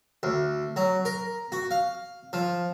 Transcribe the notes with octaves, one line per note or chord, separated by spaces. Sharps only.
D2
F#3
A#4
F#4
F5
F3